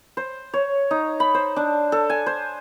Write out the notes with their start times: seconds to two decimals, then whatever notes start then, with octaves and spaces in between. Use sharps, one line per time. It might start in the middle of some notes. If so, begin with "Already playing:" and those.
0.17 C5
0.54 C#5
0.91 D#4
1.20 B5
1.34 C5
1.56 D4
1.92 A4
2.10 G#5
2.26 C5